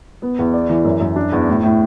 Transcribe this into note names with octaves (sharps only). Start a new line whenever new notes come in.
B3
E2
D5
E3
F#2
F#2
D4
E2
A2
A2